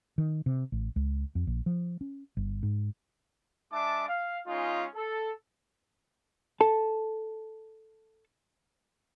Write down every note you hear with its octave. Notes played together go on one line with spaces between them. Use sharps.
D#3
C3
A1
C#2
F2
A#1
F3
C#4
G1
G#2
G#3 D4 E5 A5 D6
F5
G#3 C#4 D#4 F4
A4
A4 A5